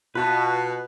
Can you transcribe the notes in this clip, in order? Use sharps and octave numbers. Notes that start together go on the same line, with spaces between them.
B2 F4 B4 A5